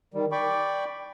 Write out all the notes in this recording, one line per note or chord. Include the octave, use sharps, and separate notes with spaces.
D#3 G3
D5 G5 B5 C#6 D6